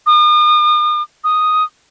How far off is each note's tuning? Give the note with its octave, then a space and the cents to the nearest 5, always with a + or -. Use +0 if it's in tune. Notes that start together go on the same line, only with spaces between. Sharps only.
D#6 -40
D#6 +0